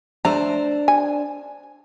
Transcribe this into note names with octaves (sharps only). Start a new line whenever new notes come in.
A3 D4 C5 A#5
G#5